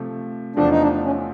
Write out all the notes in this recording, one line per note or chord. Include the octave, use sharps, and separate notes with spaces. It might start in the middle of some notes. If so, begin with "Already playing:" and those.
Already playing: C3 F3 A3
E2 C3 F3 A3 C4 D4
D#4
D4
C#4